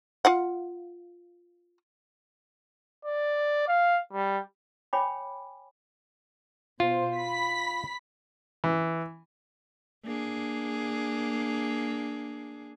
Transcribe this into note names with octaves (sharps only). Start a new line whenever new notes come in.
F4 F5 F#5
D5
F5
G3
C#5 G5 G#5 B5 D6
B2 F4 C5
B5 B6
E3
A#3 D4 G#4